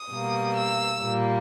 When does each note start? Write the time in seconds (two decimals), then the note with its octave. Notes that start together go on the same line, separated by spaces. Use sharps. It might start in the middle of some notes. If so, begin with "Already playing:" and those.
Already playing: D#6
0.11 B2 G3 A#3
0.57 E6
1.03 A#2 G3 A#3